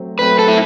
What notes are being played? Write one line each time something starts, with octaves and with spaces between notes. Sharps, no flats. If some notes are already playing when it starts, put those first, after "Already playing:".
Already playing: F#3 A3 C4
F#3 A3 C4 B4
A4
E4